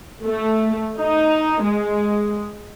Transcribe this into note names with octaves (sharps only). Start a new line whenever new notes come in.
A3
D#4
G#3